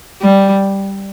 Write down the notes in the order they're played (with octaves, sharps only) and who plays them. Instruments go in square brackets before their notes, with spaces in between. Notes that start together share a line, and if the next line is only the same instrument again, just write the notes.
[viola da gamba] G3